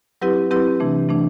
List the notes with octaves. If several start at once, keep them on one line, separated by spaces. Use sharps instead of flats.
F#3 C4 E4 G4 B4
F#3 C4 E4 G4 B4
C3 E3 A3 D4
C3 E3 A3 D4